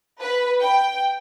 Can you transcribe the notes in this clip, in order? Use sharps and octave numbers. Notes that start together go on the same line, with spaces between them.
B4
G5